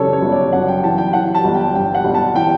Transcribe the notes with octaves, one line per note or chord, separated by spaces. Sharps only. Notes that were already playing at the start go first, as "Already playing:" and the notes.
Already playing: F#2 C#3 E3 A4 C#5 D5
C#5
G1
D5
F#2 F#5
G5
E3 A5
G5
E3 F#5
A5
G1
G5
G2 G5
F#5
G1
A5
E3 G5